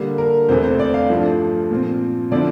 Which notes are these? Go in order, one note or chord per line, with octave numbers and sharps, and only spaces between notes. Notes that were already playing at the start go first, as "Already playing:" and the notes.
Already playing: D3 G3 A#3 D4
A#4
E2 C3 E3 A3 C5
C5
D5
F5
G2 F3 A3 D4
A#2 F3 C4
D3 F3 C4 E4 D5